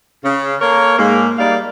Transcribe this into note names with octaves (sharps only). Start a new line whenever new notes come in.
C#3
A#3 A4 A#4 C#5
G#2 G#3 A#3
G3 A#3 D#4 D5 F5